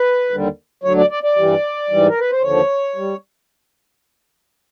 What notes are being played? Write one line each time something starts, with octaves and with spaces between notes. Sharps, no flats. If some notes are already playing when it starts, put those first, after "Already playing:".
Already playing: B4
D#2 D3 G3
D2 D3 F#3 C#5
D5
D5
D5
G2 E3 G3
G#2 E3 G3
A#4
B4
C5
D#2 D3 F3 C#5
G3